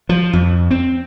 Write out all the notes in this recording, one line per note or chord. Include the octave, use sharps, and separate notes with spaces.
F3
F2
C4